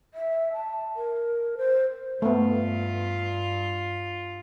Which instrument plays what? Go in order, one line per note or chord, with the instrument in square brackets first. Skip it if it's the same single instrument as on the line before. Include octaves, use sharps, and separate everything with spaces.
[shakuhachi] E5
A5
A#4
C5
[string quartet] G2 F4 [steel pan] A3 B3